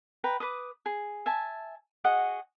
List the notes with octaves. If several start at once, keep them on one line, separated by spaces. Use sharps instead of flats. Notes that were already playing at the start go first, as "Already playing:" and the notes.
B4 G5 A#5
B4 D6 D#6
G#4
E5 G#5 A5
F#4 G#4 D#5 F#5